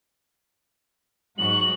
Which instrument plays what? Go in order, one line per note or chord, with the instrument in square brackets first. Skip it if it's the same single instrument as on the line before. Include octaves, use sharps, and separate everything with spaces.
[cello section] G#2 F#3 F#4 [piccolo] F#7